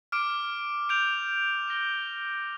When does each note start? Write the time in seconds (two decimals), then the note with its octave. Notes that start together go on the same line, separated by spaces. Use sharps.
0.12 D6 F6 D7
0.89 G6 D7 F7
1.68 D6 A#6 G7